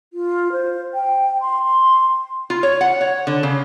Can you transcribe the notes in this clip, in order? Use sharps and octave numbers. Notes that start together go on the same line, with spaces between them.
F4
C5
G5
C6
C6
F4
C#5
F#5
C#5
D3
C#3